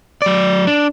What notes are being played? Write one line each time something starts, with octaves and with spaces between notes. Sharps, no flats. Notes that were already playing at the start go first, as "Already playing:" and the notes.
F#3 D5
D4